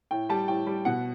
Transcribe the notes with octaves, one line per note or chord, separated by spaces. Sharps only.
A2 G5
G3 A5
A2 G5
G3
B2 F#5